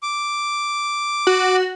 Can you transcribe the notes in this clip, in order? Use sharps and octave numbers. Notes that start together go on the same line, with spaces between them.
D6
F#4